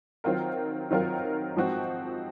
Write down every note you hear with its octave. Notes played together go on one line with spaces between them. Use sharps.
D#3 F#3 C4 F4 A#4
D#3 F#3 C4 F4 A#4
G#2 F3 C4 F#4